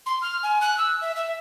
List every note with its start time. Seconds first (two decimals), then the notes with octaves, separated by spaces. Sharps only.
0.06 C6
0.22 F6
0.43 G#5
0.61 F#6
0.78 E6
1.01 E5
1.16 E5